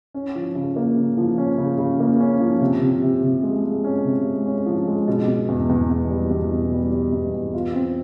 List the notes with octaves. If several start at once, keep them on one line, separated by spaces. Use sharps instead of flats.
C#4
F3
C#3
A#3
C#3
F3
C#4
C#3
C#3
A#3
C#4
F3
C3
C3
C3
C3
G#3
G#3
C#4
C3
G#3
C#4
F3
G#3
B2
B2
E2
E2
E2
G3
E2
B2
G3
G3
E2
E2
F4
C4